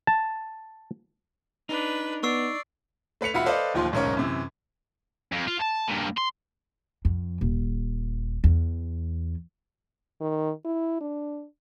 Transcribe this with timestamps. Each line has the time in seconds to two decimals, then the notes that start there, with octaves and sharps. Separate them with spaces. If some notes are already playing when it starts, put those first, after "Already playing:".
0.07 A5
1.69 D4 D#4 B4
2.23 B3 D5 C#6 E6 C7
3.21 A3 B4 B6 C#7 F7
3.34 E1 F4 F#4 E5 B5 C#7
3.46 A4 B4 C5 D5 D#5 F5
3.74 D1 D#2 F3 F4 C6
3.92 D1 B1 G#2 C#4 A#4 C#5
4.17 F#2 C3 E3
5.32 F2
5.48 F4
5.62 A5
5.88 G2 A#2
6.17 C6
7.05 F2
7.41 D#1
8.44 E2
10.21 D#3
10.65 E4
11.01 D4